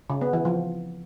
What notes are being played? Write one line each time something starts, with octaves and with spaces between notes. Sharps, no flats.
C#3
B3
E3
F3